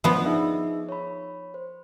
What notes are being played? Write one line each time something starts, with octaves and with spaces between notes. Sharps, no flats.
F3 B3 D4 D5
D#4 G#4 E5
C#5 B5
C5